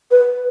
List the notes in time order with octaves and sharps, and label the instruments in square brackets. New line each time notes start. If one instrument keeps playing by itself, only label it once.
[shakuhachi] B4